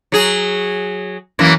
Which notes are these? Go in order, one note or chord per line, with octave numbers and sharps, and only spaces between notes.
F#3 G#4
F#2 E3 A#3